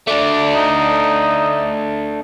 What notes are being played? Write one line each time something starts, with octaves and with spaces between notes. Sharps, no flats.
A3 D4 D5
D#4